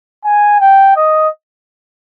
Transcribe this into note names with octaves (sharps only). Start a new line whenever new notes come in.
G#5
G5
D#5